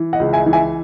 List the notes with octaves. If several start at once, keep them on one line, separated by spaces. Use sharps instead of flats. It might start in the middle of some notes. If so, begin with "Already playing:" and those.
Already playing: E3
D#5 F#5
C#2
E5 G#5
E3
E5 G#5